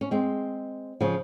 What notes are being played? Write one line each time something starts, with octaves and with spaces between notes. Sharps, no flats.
C#4
G#3 C4
C#3 F3